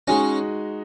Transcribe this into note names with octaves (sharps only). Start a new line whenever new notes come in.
G#3 C#4 D#4 F#4 D#5